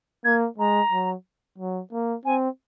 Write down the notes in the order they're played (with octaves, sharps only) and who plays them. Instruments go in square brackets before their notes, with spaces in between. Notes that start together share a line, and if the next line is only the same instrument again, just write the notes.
[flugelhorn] A#3 [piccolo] G#6
[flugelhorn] G#3 [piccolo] A#5
[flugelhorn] F#3
F#3
A#3
[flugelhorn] C4 [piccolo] G#5